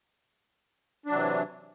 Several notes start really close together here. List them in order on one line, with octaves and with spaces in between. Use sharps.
D4 F#3 C3 E3